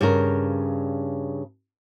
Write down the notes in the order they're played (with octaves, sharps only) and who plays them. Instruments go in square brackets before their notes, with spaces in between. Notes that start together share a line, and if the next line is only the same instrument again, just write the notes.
[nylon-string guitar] G2 C#3 A#4